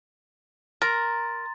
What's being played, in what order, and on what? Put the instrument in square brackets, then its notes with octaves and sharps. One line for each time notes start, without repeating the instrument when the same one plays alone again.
[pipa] A#4 [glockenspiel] A#5 C6 A6